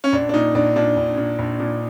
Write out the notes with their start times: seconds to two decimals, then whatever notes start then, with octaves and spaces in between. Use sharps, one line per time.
0.04 C#4
0.13 A#1 D4
0.29 D4
0.33 A#2 D#4
0.55 A#1 D4
0.76 A#2 D4
0.97 A#1
1.17 A#2
1.39 A#1
1.59 A#2